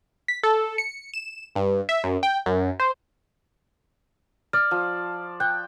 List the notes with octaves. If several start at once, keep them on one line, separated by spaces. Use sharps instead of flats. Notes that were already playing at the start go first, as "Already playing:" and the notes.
B6
A4
C#7
E7
G2
E5
F#2
G5
F#2
C5
D5 F6
F3
G5 F#6